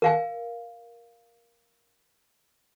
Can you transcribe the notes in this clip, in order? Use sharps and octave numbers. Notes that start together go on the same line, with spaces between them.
A#4 F5 G#5